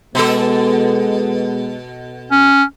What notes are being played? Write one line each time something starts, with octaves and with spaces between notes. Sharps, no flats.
B2 G#3 B3 A4
C#4